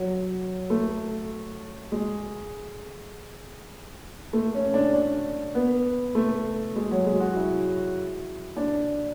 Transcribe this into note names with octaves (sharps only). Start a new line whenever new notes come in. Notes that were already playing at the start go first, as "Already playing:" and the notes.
Already playing: F#3
A3
G#3
A3
C#4
D4
D4
B3
A3
G#3
F#3
G#3
F#4
E4
D4